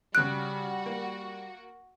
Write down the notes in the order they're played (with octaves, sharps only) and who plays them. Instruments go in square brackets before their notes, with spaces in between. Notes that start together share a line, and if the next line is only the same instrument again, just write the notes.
[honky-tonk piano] C#3 D7 [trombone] G3 [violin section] F#4 [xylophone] F#6
[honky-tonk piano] A#3